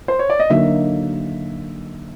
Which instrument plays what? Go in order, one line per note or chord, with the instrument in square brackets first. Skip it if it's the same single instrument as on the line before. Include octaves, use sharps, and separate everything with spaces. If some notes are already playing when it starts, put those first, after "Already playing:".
[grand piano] C5
C#5
D5
D#5
[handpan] D3 F#3 A#3 D#4 [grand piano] E5